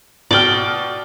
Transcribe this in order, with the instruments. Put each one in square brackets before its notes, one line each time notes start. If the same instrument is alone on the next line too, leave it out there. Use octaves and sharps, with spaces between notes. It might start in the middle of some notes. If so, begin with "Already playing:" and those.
[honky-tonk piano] B2 F6 [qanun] D5 G5